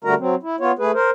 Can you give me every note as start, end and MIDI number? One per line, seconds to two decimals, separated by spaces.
0.04 0.14 50
0.04 0.14 55
0.04 0.14 57
0.04 0.14 66
0.04 0.14 70
0.04 0.14 82
0.19 0.35 54
0.19 0.35 60
0.43 0.56 64
0.60 0.72 59
0.60 0.72 65
0.60 0.72 73
0.79 0.92 57
0.79 0.92 68
0.79 0.92 71
0.94 1.11 70
0.94 1.11 72